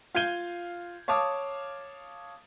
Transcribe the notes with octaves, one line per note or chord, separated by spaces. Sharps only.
F4 F5 G6 G#6 D#7 G7
C#5 F5 A5 D6 D#6